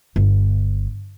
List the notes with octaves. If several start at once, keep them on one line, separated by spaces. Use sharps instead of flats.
G1